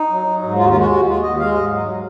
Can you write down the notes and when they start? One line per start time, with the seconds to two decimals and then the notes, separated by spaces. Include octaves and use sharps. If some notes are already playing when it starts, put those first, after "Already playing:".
Already playing: D#4
0.10 F#3
0.26 F#3
0.42 G#2
0.58 D#2 F4
0.64 F#4
0.69 F4
0.74 G#3 F#4
0.90 D#2 F#4
1.06 G#3 F4
1.22 D#2 D#5
1.39 G#3 F5
1.54 G#2 D#5
1.71 F#3